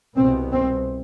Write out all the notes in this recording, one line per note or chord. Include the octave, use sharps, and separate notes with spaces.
C2 B2 C4
C4